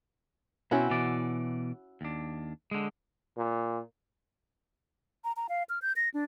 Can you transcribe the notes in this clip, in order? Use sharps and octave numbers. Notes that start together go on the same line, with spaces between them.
B2 C4 C#4 E4 F#4
B2 E3 D5
D#2 D4
D3 G#3
A#2
A#5
A#5
F5
F6
G6
A#6
D4